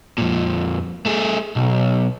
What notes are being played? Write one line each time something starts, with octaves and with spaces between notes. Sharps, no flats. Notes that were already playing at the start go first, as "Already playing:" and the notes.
F2 A#2
A3 G#4
B1